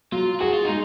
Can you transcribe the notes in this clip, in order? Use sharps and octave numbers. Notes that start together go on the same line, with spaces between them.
F#3 F4
F#4 G#4
F4
G#3 D#4